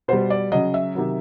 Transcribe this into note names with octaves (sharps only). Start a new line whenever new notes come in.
B2 G3 C5
D5
C#3 F#3 D#5
E5
C3 D#3 F#3